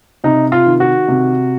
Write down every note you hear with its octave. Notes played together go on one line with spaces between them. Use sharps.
C3 D#4
F4
D#3
F#4
C3